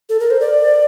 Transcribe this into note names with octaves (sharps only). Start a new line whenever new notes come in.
A4
A#4
C5
D5